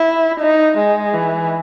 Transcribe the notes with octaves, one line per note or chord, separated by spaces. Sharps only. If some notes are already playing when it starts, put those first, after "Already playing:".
Already playing: E4
D#4
G#3
E3